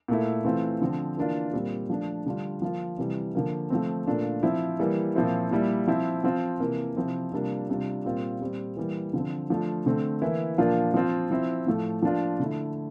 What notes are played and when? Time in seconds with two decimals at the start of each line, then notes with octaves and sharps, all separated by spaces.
0.08 A#2 A3 E4
0.45 E3 A3 C4 F4
0.81 D3 F3 C4
1.17 E3 A#3 D4 F4
1.53 A#2 G3 C4
1.90 F3 A3 D4
2.26 D3 G3 D4 F4
2.62 F3 A#3 F4
2.98 C3 E3 G3
3.35 D3 F3 A#3
3.70 F3 A3 C4
4.07 A#2 A3 D4 F4
4.43 F3 C4 E4
4.79 E3 G3 A#3
5.15 A#2 F3 C4 E4
5.51 A#2 G3 A#3 E4
5.87 F3 C4 E4
6.24 F3 C4 F4
6.60 C3 E3 A#3
6.96 C3 F3 C4 E4
7.32 C3 G3 A#3 D4 F4
7.69 C3 G3 D4 F4
8.05 A#2 G3 C4 F4
8.40 A#2 G3 C4
8.77 E3 G3 A#3
9.13 D3 F3 C4
9.50 F3 A3 D4 F4
9.86 D3 A3 C4
10.22 E3 A#3 E4
10.58 A#2 F3 A#3 D4 F4
10.94 F3 C4 F4
11.31 F3 C4 E4
11.66 A2 F3 A3
12.02 F3 A#3 D4 F4
12.39 D3 A3 E4